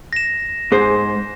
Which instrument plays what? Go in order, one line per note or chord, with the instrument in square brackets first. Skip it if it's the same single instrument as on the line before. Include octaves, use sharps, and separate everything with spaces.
[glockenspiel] A#6 E7
[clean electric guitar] G#2 [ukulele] G#4 C5